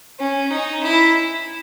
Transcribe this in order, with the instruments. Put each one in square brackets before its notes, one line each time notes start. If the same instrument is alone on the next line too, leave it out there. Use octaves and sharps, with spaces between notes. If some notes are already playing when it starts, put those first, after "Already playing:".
[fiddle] C#4
D#4
E4